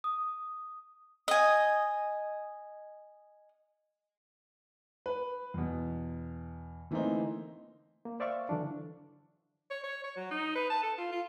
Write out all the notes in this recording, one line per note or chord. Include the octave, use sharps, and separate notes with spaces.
D#6
D#5 G#5
B4
E2 B2
D3 E3 A3 A#3 C4 D#4
A#3
C5 D5 E5 F5 C#6
D3 E3 F#3 D4
C#5
C#5
C#5
F#3
D#4
B4
A5
A4
F4
F4